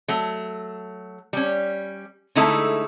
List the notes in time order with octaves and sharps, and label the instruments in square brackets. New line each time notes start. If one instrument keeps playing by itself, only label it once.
[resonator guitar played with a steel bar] F#3 A3
G3 C#4
D3 G#3 A3 D#4 E4 A4